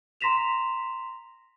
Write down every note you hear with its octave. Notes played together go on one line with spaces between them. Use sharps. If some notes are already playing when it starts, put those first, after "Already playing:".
A#5 C6 A#6 B6 E7 F7